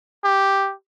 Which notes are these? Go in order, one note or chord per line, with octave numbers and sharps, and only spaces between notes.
G4